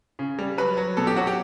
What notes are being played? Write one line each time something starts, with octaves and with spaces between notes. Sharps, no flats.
C#3
G3
F#3 B4
F#3
B2 A4
G4
F#3 F#4
G4